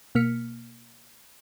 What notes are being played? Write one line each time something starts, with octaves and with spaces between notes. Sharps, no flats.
B2 A#3 F6 B6 C#7